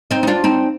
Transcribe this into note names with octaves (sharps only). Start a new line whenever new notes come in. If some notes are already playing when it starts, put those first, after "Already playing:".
C4 D#4
D#4
D4 F4
C4 D#4